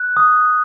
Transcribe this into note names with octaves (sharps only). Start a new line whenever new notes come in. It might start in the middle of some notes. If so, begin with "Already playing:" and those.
Already playing: F#6
D#6